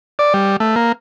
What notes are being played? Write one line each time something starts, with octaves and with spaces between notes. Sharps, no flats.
D5
G3
A3
A#3